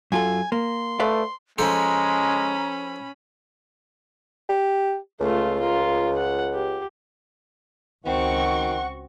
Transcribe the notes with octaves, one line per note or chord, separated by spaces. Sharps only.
F#2 F4 A4 G#5
A#3 C6
A3 B4 D5 F5
F3 G#3 C#4 A4 C5 A#5 B5
G4
C#2 A3 F4
F4 A#4
F#5
G4
C#2 D#3 C4 F#4 F#5 C#6